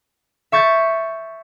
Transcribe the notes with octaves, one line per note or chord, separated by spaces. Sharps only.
E5 C#6 G6 A6